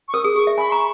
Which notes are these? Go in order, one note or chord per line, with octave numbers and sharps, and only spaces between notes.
C#6
A#4 D#6
G#4
G#4 C#6
E5
G#5 B5
A#5 C#6